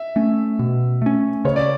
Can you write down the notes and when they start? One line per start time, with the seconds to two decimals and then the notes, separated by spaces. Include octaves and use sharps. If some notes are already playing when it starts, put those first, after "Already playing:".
Already playing: E5
0.16 A3 C#4
0.59 B2
1.02 A3 C#4
1.45 C#3 C#5
1.56 D5